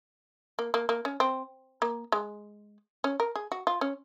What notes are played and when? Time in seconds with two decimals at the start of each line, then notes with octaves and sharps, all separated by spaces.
0.59 A#3
0.74 A#3
0.89 A#3
1.05 C#4
1.20 C4
1.82 A#3
2.12 G#3
3.04 C#4
3.20 A#4
3.36 G#4
3.52 F#4
3.67 F4
3.81 C#4